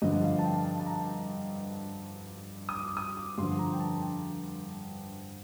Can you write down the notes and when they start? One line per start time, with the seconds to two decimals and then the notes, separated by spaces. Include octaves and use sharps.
0.02 G2 D3 F3 D#5
0.23 F5
0.39 A5
0.45 G5
0.65 A5
0.80 A5
0.86 A#5
2.69 D#6
2.75 D6
2.97 D#6
3.17 D6
3.38 G2 D3 F3 C6
3.59 A#5
3.73 G5
3.80 A5
4.01 G5